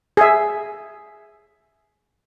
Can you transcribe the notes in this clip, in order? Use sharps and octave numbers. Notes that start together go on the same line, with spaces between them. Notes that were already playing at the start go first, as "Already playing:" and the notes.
G#4 E5